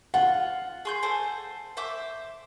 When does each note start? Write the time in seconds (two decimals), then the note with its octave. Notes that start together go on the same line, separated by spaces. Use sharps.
0.14 F4 F#5
0.85 G#4 C6 G6
1.03 A4 C5 G#5
1.77 C5 E5 D6